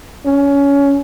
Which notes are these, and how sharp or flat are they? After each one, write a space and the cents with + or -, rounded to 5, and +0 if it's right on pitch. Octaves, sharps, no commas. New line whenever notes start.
C#4 +20